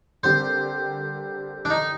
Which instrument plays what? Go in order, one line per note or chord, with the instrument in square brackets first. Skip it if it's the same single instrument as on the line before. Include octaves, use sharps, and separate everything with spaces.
[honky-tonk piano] D3 G3 C4 G4 A#4 [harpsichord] C5
[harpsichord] D4
D#4